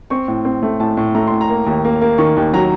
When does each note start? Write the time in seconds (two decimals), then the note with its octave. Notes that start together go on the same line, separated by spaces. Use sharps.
0.10 C4 C#6
0.28 A2
0.45 C4
0.63 A3
0.80 A2 A5
0.97 A2
1.15 A3 A#5
1.27 A2 C6
1.41 A#5
1.50 A#3
1.66 D#2
1.85 A#3
2.01 A#3
2.18 D#3 C#6
2.36 D#2
2.53 F#3 A#5